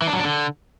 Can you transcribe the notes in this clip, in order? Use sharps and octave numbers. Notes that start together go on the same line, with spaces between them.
E3
D4
F#3
D4
D3